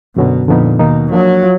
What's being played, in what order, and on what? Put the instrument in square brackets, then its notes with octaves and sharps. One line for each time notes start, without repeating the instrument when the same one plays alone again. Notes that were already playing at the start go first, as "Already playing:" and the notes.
[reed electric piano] F#2 D3 F#3 B3 [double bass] B2
[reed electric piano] F2 D3 F3 B3 D#4 [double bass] A#2
[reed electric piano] D#2 D#3 A#3 D#4 [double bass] B2
[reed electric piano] F3 A#3 D4 [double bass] F#3
[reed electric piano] F4